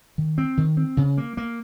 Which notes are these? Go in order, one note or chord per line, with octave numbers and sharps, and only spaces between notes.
D#3
C4
D#3
C4
C#3
A#3
A#3